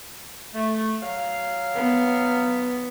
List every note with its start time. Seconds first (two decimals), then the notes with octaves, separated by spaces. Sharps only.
0.54 A3
1.02 F#3 F5
1.75 B3